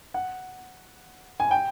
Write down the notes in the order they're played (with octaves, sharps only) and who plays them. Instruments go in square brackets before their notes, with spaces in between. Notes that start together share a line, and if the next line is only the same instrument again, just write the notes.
[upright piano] F#5
G#5
G5